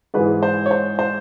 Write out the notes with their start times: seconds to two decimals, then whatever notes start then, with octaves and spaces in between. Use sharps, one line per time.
0.14 G#2 E3 G#3 B4
0.43 C5
0.66 C#5
0.71 C5
0.99 C5